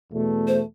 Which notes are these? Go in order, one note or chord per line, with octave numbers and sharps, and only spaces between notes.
E2 B2 A3
C5